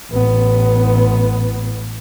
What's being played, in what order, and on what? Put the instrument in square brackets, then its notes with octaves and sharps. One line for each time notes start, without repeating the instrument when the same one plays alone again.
[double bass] A1 B3